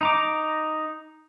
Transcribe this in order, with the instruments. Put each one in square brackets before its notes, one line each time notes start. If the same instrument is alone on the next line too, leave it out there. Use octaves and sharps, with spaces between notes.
[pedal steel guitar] D#4 A#5 D6